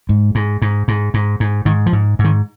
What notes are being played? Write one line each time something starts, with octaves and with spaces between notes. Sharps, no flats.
G#2
G#2
G#2
G#2
G#2
G#2
G#2 D#3
F3
G#2
G#2
D#3